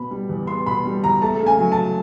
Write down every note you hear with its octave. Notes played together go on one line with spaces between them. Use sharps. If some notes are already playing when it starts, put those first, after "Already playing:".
Already playing: B2 B3 B5
G3
E2
B3 C6
B2 B5
G3
E2 A#5
A3 A5
C#3
G#5
F#3
A5